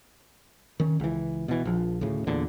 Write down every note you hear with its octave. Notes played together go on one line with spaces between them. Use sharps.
D#3 C#4
C#2 E3
B2 E3
A#1 F3
D2 A2 C#3
E2 A#2 D3